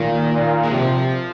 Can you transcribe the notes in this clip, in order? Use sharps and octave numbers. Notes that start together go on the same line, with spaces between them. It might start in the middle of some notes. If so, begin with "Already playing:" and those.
Already playing: A#2 D#3
A#2
G#3
C3 F3